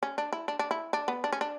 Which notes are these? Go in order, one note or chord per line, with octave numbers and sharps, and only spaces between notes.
C#4
D4
E4
D4
D4
E4
D4
B3
D4
C#4
D4